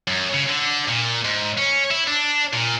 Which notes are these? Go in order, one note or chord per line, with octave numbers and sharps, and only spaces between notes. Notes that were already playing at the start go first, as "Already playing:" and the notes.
F#2
C#3
D3
A#2
G#2
C#4
E4
D4
A#2